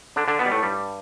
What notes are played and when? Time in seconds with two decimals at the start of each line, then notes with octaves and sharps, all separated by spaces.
0.16 D3 D4
0.28 D3 D4
0.39 B2 B3
0.46 G3
0.52 A2 A3
0.63 G2 G3